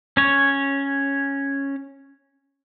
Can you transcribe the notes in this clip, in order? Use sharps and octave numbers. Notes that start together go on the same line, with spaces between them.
C#4 C#5